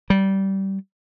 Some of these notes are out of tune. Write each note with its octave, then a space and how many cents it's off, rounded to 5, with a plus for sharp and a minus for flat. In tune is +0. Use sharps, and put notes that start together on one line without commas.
G3 -20